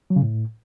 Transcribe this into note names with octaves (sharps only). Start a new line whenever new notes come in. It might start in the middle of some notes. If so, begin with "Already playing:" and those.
F#3
C#3
A2